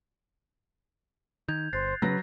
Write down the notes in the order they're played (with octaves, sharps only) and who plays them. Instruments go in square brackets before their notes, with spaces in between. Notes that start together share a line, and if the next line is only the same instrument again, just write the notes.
[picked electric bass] D#3 [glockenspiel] G6 G#6 F7
[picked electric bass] G1 [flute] C5 [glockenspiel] F#6 A6 C7
[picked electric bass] C#3 [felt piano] F#3 A#6 [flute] B4